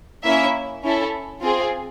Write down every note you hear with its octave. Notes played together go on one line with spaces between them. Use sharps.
A#3 C#4 E4 E5
C#4 E4 A4
C4 F4 G#4